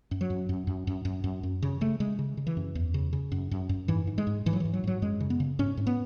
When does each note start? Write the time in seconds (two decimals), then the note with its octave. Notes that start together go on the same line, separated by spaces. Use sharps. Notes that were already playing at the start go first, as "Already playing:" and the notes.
0.11 F#2
0.21 F#3
0.30 F#2
0.49 F#2
0.67 F#2
0.87 F#2
1.05 F#2
1.24 F#2
1.43 F#2
1.62 C#3
1.81 C#3 A3
2.00 C#3 G#3
2.19 C#3
2.37 C#3
2.47 E3
2.57 F#2
2.75 E2
2.94 C#3
3.13 C#3
3.32 F#2
3.51 F#2
3.69 F#2
3.88 G#2 E3
4.07 G#2
4.18 G#3
4.27 G#2
4.46 G#2 E3
4.53 F#3
4.60 G#2 E3
4.73 F#3
4.84 G#2 F#3
5.02 F#2 G#3
5.20 C#3
5.30 B3
5.40 C#3
5.59 G#2 C#4
5.77 G#2
5.87 B3